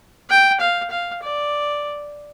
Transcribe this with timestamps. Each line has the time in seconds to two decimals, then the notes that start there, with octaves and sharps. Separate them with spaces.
0.30 G5
0.60 F5
0.90 F5
1.22 D5